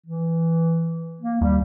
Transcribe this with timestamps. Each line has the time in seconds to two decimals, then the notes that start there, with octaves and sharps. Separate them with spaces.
0.06 E3
1.21 A#3
1.41 D#2 G3